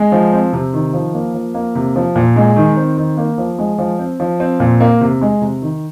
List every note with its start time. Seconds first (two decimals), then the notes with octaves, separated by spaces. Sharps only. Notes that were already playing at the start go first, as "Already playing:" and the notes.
Already playing: G#3
0.12 F3
0.33 C4
0.53 C3
0.73 D#3
0.93 F3
1.14 A#3
1.34 F3
1.55 A#3
1.75 C3
1.96 F3
2.16 A#2
2.36 G#3
2.56 D#3
2.77 C4
2.97 D#3
3.18 A#3
3.38 F3
3.59 G#3
3.78 F3
3.99 C4
4.20 F3
4.40 C4
4.60 A#2
4.81 A#3
5.01 C3
5.21 G#3
5.42 C3
5.62 D#3